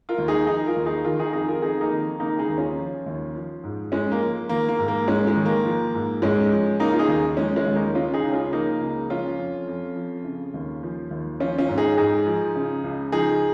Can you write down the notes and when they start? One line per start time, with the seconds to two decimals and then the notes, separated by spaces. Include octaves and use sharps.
0.09 F4 A#4
0.18 D#2
0.28 D#4 G#4
0.47 F3 D#4 G#4
0.66 F4 A#4
0.76 D#2
0.86 D#4 G#4
1.05 D#3 F4 A#4
1.20 D#4 G#4
1.33 F2 D#4 G#4
1.48 F4 A#4
1.62 F2 D#4 G#4
1.81 A#3 D#4
1.92 D#3
2.20 C#3 A#3 D#4
2.39 D#4 G#4
2.49 D#2
2.58 C#4 F4
2.77 F3
3.06 D#2
3.35 F3
3.63 G#2
3.92 G#2 G#3 C#4
4.12 A#3
4.21 F3
4.49 D#3 A#3
4.68 A#3
4.78 G#2
4.88 A#3
5.07 G#2 G#3 C#4
5.27 G#3
5.36 D#3
5.46 A#3
5.65 F3
5.94 G#2
6.22 G#2 G#3 C#4
6.52 F3
6.80 C#3 A#3 D#4
6.92 F4
6.99 D#4 G#4
7.08 D#2
7.37 F3 G#3 C#4
7.56 G#3 C#4
7.66 D#2
7.76 A#3 D#4
7.94 C#3 C#4 F4
8.14 D#4 G#4
8.23 C#2
8.33 C#4 F4
8.52 F3 A#3 D#4
8.81 C#2
9.10 F3 C#4 F4
9.38 F2
9.67 F2
9.96 F3
10.24 C#3
10.54 D#2
10.83 F3
11.11 D#2
11.40 F3 C#4 F4
11.58 C#4 F4
11.68 G#2
11.78 D#4 G#4
11.97 G#2 D#4 G#4
12.26 F3
12.56 C#3
12.84 C#2
13.12 F3 D#4 G#4